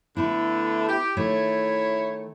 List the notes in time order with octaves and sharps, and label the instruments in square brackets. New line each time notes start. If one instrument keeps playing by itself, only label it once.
[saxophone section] D3 A3 [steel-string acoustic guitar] B3 E4
[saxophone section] G4
[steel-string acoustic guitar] D#3 A3 [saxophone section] E4 C#5